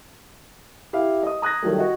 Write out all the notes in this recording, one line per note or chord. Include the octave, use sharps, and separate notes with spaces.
E4 G4 F5
D#5 D#6
A#5 D#6 F#6 G#6 A#6
D#3 F#3 G3 A3
F#4 D#5